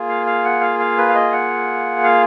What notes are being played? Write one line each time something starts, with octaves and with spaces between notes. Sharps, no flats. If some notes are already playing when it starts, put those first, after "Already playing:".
Already playing: A#3 F4 G#4
F5
F5
F#5
F5
F5
B4
F5
D#5
F#5
F5